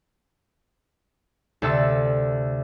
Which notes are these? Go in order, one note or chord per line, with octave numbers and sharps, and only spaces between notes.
D2 C3 A4 E6